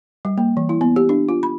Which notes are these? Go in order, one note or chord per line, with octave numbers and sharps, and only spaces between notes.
G3
A#3
E3
E4
B3
G4
D4
F4
B5